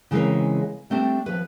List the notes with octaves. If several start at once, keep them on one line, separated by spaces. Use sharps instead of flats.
C#3 E3 G#3 C4 A#4 F5
G3 A3 C4 D4
F3 B4